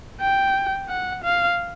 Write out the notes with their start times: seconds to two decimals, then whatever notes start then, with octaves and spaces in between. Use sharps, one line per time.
0.21 G5
0.89 F#5
1.24 F5